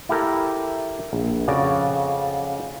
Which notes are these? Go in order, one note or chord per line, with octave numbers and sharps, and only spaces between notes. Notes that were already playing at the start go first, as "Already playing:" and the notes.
E4 G4 A4 A#4
A#1
F2 C#3 F#4 D5